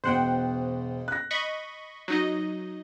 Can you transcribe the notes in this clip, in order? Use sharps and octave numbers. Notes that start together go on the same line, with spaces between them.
E1 B2 C5 F#5 G5
F#6 A#6
D#5 B5 C#6
F#3 D#4 D#5